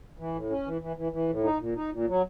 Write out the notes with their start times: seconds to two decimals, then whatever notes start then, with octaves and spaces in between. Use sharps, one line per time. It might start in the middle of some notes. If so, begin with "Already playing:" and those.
0.19 E3
0.35 A2
0.50 C#4
0.66 E3
0.81 E3
0.97 E3
1.12 E3
1.29 A2
1.44 D#4
1.59 A#2
1.76 D#4
1.91 A#2
2.08 F#3